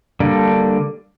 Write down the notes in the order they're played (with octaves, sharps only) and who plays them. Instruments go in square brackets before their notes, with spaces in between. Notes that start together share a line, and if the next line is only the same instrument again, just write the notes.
[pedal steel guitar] D3 G3 A#3 D4